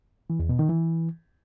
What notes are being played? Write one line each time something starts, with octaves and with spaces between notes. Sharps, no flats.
E3
E2
B2
D#3
E3